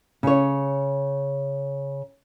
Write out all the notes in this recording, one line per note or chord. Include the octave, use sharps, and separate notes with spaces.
C#3 C#5